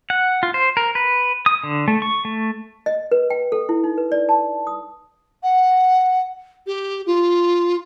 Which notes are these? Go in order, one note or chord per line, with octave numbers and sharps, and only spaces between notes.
F#5
F4
C5
A#4
B4
D#6
D3
A3
C#6
A3
D#5
B4
G5
A4
E4
D#4
B4
D5
A5
D#6
F#5
G4
F4